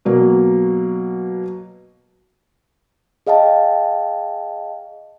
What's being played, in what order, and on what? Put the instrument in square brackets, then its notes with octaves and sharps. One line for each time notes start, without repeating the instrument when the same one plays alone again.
[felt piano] B2 F#3 A#3
[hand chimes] G#4 D#5 F5 G5 A5